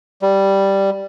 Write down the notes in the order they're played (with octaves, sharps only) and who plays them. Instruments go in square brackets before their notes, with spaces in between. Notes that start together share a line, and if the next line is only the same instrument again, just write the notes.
[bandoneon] G3